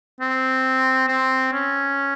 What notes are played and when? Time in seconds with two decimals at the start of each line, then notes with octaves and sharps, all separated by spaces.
0.20 C4
1.08 C4
1.53 C#4